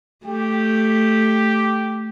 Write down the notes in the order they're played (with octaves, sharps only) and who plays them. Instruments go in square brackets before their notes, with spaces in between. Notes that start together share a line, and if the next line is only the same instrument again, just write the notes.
[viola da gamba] A3 [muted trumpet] G4